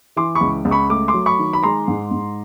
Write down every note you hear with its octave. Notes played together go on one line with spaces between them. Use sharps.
E3 C6 D6
B5 C#6
C#2
C#2
B5 C#6
A3 D6
C6 D6
F#3
B5 C#6
D#3
B5
G#3 A#5 C6
G#2
G#2